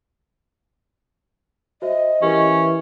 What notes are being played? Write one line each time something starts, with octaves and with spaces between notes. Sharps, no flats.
F#4 C5 D#5 E5
E3 C#4 G4 A#4